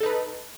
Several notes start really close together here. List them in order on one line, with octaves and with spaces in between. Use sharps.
A4 D#4 B4